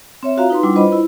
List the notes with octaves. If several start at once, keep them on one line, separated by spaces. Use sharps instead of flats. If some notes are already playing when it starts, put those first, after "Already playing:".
C4 C#5 E5
F4 F#4 F5 A#5
D#4 B4 C6
G3 D4 E4 F4 F#5 D6
F4 B4 C5 D#5 B5
E4